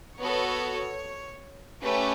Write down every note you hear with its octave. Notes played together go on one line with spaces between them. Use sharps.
B3 F#4 A4 C#5
A3 C#4 G4 B4